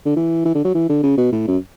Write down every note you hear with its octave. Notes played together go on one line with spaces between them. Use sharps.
D3
E3
E3
D3
F#3
E3
D3
C#3
B2
A2
F#2